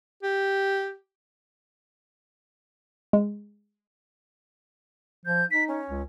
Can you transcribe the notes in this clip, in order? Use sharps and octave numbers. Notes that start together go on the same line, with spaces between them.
G4
G#3
F3 G6
D#4 B6
C#4
C#2